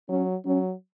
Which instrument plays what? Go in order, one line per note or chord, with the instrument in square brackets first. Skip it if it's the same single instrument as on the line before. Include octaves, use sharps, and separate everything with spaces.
[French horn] F#3 [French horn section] C#4
[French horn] F#3 [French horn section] C#4